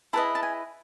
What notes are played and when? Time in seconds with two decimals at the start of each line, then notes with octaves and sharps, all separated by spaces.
0.13 E4 G#4 B4 D#5 A5
0.35 A5
0.43 G#5